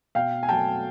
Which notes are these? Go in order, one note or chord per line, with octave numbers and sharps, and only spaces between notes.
B2 F5 G5
G#5
F#3 A3 G5 A5